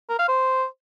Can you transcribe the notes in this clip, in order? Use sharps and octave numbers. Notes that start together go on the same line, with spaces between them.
A#4
F5
C5